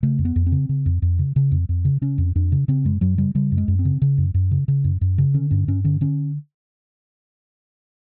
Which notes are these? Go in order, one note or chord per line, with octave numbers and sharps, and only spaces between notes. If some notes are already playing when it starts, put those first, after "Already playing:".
C#3 A3
F2
B3
F2
C4
C#3
C#3
F2
F2
C#3
C#3
F2
F2
C#3
C#3 C#4
F2
F2 D4
C#3
C#3 C4
F#2 G#3
F#2 F#3
C#3 G3
C#3 G3
F#2
G#3
F#2
C4
C#3
C#3
F#2
F#2
C#3
C#3
F#2
F#2
C#3
D3 C#4
G2 C#4
G2 C#4
D3 C#4
D3 C#4